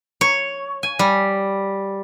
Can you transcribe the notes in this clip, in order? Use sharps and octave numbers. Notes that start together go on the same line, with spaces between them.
C#5
G#5
G3